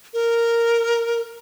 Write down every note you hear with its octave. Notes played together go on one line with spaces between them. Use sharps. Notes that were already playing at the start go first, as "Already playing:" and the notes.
A#4